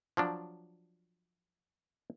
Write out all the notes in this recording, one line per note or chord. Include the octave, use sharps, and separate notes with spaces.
F3 F#3 D4